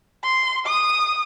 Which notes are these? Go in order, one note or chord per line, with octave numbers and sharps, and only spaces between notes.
C6
D#6